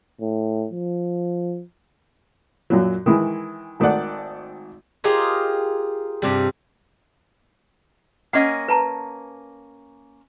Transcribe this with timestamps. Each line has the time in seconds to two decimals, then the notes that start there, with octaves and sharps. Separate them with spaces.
0.21 A2
0.72 F3
2.70 F#2 A#2 F#3
3.06 D#3 E3 G#3 E4
3.80 G#1 D#3 A3 A4 D5 F#5
5.04 F4 G4 G#4 A#4 C5 D#5
6.22 G2 C3 G3
8.33 A#3 C#4 D#5 F#5
8.68 B4 A5 A#5